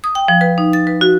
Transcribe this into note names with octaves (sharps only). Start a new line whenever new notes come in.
D#6
G5
F3
B4
D#4
A6
B4
F#4